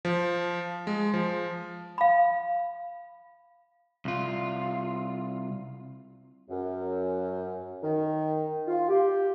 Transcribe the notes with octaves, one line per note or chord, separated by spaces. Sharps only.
F3
G#3
F3
F5 B5
C2 F4
F#2
D#3
F4
G4